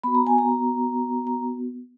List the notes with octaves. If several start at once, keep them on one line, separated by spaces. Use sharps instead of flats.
B3 F#4 B5
A#5
G#5
A#5
A#5